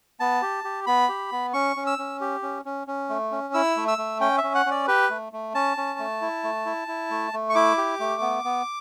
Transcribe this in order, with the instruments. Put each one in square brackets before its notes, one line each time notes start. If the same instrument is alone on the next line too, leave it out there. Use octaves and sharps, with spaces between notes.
[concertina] B3 A5
G4
G4
B3 B5
G4
B3
C#4 C#6
C#4
E6
C#4
G4
C#4
C#4
C#4
A3
C#4
E4 E6
A3
E6
A3
C#4 G5
E5
C#4
F#5
C#4 D5
G4 B4
A3
A3
C#4 A5
C#4
A3
E4
A3
E4
E4
A3
A3
C#6
E4 D6
G4
A3
B3
B3